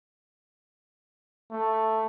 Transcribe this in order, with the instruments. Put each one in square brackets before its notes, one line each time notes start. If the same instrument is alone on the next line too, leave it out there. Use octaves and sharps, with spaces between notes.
[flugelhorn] A3